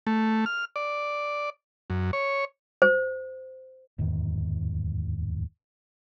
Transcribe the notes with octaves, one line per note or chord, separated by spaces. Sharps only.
A3
F6
D5
F#2
C#5
C5
D1 E2 G#2 D#3